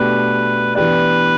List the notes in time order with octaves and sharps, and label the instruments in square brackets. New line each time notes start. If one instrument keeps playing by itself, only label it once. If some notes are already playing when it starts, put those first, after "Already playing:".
Already playing: [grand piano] B2 A3 D4 G4 [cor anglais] B4
[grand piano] E3 B3 D4 G4 D5 [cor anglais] B4